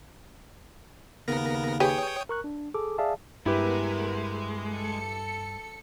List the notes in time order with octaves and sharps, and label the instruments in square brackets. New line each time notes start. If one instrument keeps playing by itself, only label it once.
[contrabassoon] D#2 [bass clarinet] C#3 [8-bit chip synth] B3 A#4 A#6
[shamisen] G4 G#4 B4 [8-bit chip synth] C#5 G5 D#6
[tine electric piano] A#4 C#6 F#6
D4
G#4 A4 D6
G#4 D5 E5 F5 A5
[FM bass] G2 [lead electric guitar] G#3 [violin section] B3 A#4 E5 [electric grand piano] E4 G4 B4
[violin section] A4 C#7